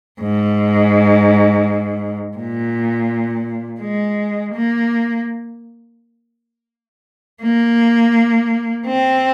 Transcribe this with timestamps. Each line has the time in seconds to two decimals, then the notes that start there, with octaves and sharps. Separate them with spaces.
0.21 G#2
2.37 A#2
3.81 G#3
4.54 A#3
7.43 A#3
8.87 C4